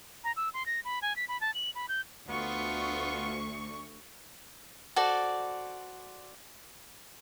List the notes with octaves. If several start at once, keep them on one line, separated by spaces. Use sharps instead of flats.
A#5
E6
C6
A#6
B5
G#5
B6
B5
A5
F#7
B5
G6
D2 B3 F4 C#6
F#4 A4 C5 D5